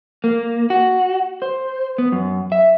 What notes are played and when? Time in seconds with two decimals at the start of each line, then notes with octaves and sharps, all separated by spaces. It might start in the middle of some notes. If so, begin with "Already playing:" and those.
0.24 A#3
0.70 F#4
1.42 C5
1.98 B3
2.12 F#2
2.52 E5